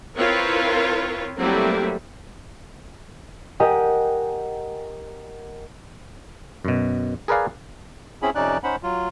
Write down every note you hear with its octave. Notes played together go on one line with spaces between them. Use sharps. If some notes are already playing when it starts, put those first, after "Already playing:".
C4 E4 F4 A#4 B4 C#5
F#3 G3 A3 A#3 C4 E4
G4 A#4 D#5 F#5 G#5
F#2 B2
G#4 A#4 B4 D5 F5 G#5
C4 C#4 E4 G#4 B5
F2 C3 C#4 D#4 D5 F#6
C#4 D#4 C5 F#5 B5
F#3 F4